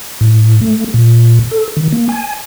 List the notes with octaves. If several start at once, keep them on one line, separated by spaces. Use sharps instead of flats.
A2
A3
A#2
A4
D#3
A#3
G#5